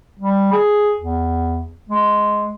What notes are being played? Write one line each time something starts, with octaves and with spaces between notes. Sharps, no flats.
G3
G#4
E2
G#3